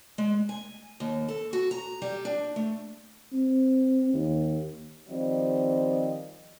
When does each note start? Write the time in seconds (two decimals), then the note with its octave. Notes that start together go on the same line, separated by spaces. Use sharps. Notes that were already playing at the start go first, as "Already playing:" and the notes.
0.18 G#3
0.49 G#5
1.00 D#2
1.29 A4
1.53 F#4
1.71 A#5
2.02 G3
2.25 D4
2.56 A3
3.33 C4
4.14 D#2
5.09 D#3 F3 G3 C4 D#5